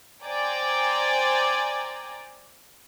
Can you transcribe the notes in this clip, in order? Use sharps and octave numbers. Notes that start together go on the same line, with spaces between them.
C5 D5 G5 G#5 A#5